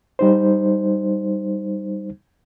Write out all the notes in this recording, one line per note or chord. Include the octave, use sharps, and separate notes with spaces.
G3 D#4 C5